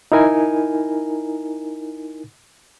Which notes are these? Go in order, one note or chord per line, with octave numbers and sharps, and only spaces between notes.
D#4 E4 A#4 G#5